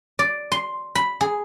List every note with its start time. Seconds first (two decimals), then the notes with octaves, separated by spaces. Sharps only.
0.19 D5
0.52 C6
0.95 B5
1.21 G#4